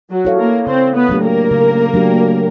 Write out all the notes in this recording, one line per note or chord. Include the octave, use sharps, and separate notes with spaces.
F#3 F#4
E4 A4 C#5 F5
A#3 A#4
C#3 C4 C5
B3 B4
F#3 A3 D4 G4
A#3 A#4
C#3
F#3 A3 D4 G4